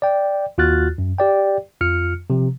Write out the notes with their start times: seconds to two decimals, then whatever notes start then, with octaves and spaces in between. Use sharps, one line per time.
0.02 D5 G5
0.58 D#2 F4 F#4 F6 F#6 A6
0.98 F#2
1.18 G4 D5 G5
1.81 F2 F4 F6 C#7
2.30 C3 F3